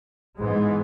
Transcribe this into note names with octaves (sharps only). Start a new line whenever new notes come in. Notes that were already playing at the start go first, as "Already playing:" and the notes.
G#2 E3 G#3 B3